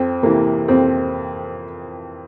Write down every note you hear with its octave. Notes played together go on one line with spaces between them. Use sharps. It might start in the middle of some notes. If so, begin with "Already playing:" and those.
Already playing: F2 C4
C3 E3 A#3
F2 C4